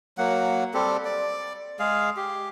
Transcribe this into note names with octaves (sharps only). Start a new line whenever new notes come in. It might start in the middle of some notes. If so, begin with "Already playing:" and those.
F#3 A#3 F#5
G3 C4 G4 A4
D5
G#3 G#4 F5
G4